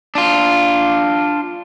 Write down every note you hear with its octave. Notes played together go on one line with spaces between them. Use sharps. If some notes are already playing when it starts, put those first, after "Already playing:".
D4 F4